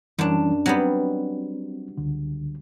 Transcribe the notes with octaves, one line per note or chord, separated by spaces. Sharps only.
F#2 E3 G3 C#4 D4
F#3 G3 B3 C4
C#2 D3